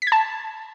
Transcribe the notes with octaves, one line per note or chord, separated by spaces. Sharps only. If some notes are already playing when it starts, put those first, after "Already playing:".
B6
G#6
A5